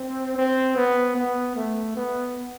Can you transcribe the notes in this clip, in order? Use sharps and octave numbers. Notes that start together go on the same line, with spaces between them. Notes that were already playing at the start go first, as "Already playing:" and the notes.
Already playing: C4
C4
B3
B3
A3
B3